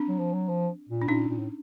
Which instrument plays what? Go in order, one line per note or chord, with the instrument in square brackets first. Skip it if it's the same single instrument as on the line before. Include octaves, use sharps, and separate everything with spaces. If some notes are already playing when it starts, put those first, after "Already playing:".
Already playing: [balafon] C4 D4
[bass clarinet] F#3
F3
F#3
F3
A#2
[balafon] D4
[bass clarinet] A#2 [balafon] C#4 D#4
[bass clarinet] A#2
A2